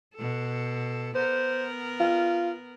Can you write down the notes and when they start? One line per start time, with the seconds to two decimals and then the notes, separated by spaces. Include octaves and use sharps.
0.15 B2 A4
1.15 B3 A#4 C5
2.00 F4